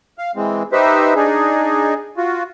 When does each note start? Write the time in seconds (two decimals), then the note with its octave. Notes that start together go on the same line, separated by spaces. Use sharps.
0.18 F5
0.36 E3 G#3 C4
0.72 D#4 G4 B4 C5 E5
1.15 D4 D#4 G#4
2.17 F4 F#4